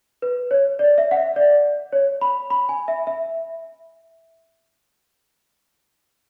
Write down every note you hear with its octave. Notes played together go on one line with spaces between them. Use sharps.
B4
C#5
D5
E5
F#5
E5
D5
C#5
B5
B5
G#5
E5
E5